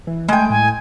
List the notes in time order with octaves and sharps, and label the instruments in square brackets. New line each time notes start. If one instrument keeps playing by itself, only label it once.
[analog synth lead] E3
[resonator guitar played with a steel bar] G#3 G5 [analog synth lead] A3 [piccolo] G#5
[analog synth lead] A2 [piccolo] G#5